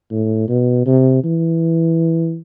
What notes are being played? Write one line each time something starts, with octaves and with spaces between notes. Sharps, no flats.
A2
B2
C3
E3